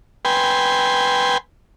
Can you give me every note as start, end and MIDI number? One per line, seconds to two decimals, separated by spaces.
0.25 1.38 71
0.25 1.38 79
0.25 1.38 80
0.25 1.38 84